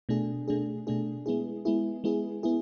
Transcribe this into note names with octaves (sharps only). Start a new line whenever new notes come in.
B2 A3 D4 G#4
B2 A3 D4 G#4
B2 A3 D4 G#4
G#3 B3 E4 G#4
G#3 B3 E4 G#4
G#3 B3 E4 G#4
B3 E4 G#4